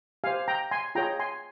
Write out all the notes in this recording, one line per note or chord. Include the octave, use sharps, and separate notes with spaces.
G4 C5 F5 G#5
G5 A#5
G#5 C6
F4 G#4 C#5 G5 A#5
G#5 C6